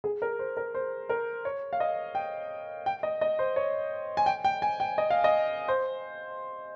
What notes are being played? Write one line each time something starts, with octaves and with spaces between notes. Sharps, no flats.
G#4
A#4
C5
A#4
C5
A#4
C#5
F5
D#5
G5
G5
D#5
D#5
C5
C#5
G#5
G5
G5
G#5
G5
D#5
F5
D#5
C5